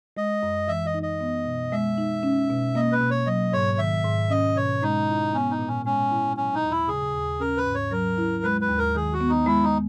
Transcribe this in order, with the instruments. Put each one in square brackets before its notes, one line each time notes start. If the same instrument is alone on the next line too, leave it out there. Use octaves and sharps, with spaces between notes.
[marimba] G#3 [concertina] D#5
[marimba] F#2
[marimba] E3 [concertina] E5
[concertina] D#5
[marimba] D#4
[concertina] D#5
[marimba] B3
B2
[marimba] G#3 [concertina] E5
[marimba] D#4
C#4
B2
[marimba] A#3 [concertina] D#5
[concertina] B4
[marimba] B2
[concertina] C#5
[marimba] F#3 [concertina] D#5
[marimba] G#2 [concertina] C#5
[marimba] D#3 [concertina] E5
[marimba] G#2
[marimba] C#4 [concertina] D#5
[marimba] B2 [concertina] C#5
[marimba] G#3 [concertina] D#4
[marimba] E4
[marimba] B3 [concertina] C#4
[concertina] D#4
[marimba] A#2
[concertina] C#4
[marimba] G#3 [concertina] C#4
[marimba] E4
[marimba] F#3 [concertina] C#4
[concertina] D#4
[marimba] D#2
[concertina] E4
[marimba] C#3 [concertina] G#4
[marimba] D#2
[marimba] C#4 [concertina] A#4
[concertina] B4
[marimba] G#2
[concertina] C#5
[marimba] F#3 [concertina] A#4
[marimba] E4
[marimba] G#3 [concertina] B4
[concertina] B4
[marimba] D#2
[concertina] A#4
[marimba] D#3 [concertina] G#4
[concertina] F#4
[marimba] B3
[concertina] D#4
[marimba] G#3 [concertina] E4
[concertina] D#4